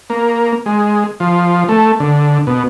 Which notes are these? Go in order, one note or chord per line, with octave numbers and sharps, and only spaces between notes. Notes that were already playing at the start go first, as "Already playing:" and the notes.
A#3
G#3
F3
A3
D3
B2